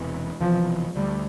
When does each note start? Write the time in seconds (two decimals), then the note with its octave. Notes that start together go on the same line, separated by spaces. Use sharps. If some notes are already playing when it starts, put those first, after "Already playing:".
Already playing: E1 E2 C3 E3
0.41 E1 E2 C3 E3 F3
0.95 D2 D3 G3 A3